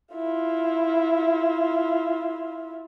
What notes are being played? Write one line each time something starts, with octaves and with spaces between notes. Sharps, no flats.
E4 F4